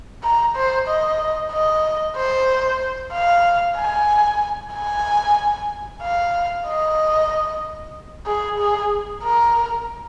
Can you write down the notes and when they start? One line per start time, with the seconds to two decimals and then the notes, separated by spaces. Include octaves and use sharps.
0.23 A#5
0.56 C5
0.87 D#5
1.52 D#5
2.16 C5
3.13 F5
3.77 G#5
4.73 G#5
6.02 F5
6.66 D#5
8.26 G#4
8.58 G#4
9.23 A#4